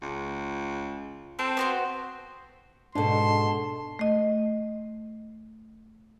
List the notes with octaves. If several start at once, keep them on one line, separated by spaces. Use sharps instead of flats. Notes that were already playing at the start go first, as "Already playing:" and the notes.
C#2
C4 A4
B3 F#4 C5
G#2 B2 D4 A4 A5 C6
A3 D#5